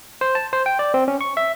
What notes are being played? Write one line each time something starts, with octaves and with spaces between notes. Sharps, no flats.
C5
A5
C5
G5
D5
C4
C#4
C#6
E5